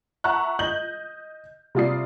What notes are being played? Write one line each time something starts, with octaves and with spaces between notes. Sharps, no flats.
E5 F#5 A5 A#5 C#6 F#6
D#5 G6 F#7
C3 G3 F4 D5 D#6 C7